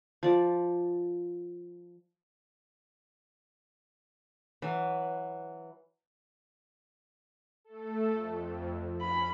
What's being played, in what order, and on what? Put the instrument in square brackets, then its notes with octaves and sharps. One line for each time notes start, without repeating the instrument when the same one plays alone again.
[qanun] F3 D5
[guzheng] E3 F#3 B4
[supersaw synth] A3 A4
F2
[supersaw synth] C#4 [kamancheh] B5